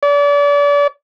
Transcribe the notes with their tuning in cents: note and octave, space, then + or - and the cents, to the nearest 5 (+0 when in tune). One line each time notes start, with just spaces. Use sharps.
D5 -35